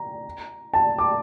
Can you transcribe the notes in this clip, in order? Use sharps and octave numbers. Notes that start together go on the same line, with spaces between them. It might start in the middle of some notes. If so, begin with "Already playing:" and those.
Already playing: A#5
A5
D6